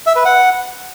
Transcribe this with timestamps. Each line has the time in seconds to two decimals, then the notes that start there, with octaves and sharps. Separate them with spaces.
0.06 E5
0.16 B4
0.25 F#5